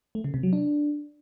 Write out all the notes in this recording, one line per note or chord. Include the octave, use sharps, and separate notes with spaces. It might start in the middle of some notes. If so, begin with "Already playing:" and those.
A3
C#3
C3
F#3
D4